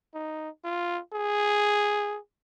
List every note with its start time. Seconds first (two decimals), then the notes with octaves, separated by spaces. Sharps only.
0.14 D#4
0.65 F4
1.14 G#4